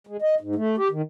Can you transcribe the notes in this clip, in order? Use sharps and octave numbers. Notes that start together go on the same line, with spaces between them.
G#3
D#5
G#2
A3
G4
D#3